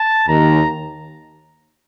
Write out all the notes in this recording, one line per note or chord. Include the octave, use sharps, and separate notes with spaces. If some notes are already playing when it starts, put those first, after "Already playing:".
Already playing: A5
D#2 D#3 A#5